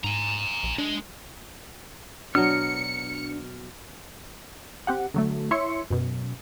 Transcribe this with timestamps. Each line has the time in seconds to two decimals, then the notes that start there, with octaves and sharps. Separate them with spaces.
0.04 G#2 G#5 A#5
0.63 A#1
0.78 G#3 D4
2.35 B2 F#3 D4 F6 C#7
4.87 C4 G4 F#5
5.14 D3 F#3 A3
5.51 E4 C#5 E5 C6 C#7
5.90 F#2 B2